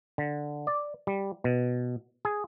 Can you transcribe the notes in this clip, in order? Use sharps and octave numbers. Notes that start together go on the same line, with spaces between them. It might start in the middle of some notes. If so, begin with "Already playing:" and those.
D3
D5
G3
B2
G#4